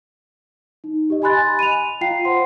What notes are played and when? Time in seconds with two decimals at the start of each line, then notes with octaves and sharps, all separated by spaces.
0.84 D#4
1.10 G4 D#5
1.22 D#5 G#5 B5 C6 F#6 A6
1.59 D#7 F7
2.01 F4 F5 G5 A#5 C7
2.25 C5 F#5 C6